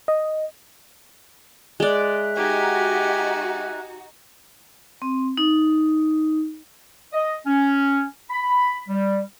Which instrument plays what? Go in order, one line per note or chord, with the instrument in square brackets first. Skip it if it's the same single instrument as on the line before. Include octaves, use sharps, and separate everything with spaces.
[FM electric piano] D#5
[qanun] G#3 D5 [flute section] E5 A#5 F#6
[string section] D#4 F#4 [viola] G4 G#5
[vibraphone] C4
D#4
[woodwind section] D#5
C#4
B5
G3